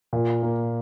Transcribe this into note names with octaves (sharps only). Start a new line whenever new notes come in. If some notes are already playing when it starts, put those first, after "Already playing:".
A#2
A#3